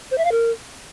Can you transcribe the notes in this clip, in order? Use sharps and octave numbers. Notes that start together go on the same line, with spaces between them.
C5
E5
F5
A#4